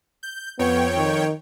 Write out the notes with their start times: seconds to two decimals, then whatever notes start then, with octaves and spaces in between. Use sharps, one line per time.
0.23 G6
0.59 F2 B3 C#5 G5
0.97 D#3